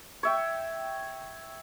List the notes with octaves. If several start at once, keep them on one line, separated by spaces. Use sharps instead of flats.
C#5 E5 G5